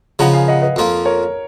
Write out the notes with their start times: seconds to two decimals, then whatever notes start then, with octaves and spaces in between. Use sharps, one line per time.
0.19 C#3 F3 B3 D#4 F#5 A#5
0.33 F5 G#5
0.48 D#5 F#5
0.62 B4 D#5
0.76 F2 F3 A#3 F4
1.05 A#4 C#5